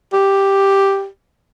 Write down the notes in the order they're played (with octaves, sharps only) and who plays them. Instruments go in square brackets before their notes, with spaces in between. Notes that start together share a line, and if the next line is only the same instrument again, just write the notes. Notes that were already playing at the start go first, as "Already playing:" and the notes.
[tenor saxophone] G4